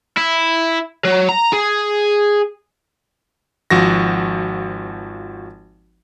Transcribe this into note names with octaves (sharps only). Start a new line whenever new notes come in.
E4
F#3
A#5
G#4
G#1 F3 F#4 A#6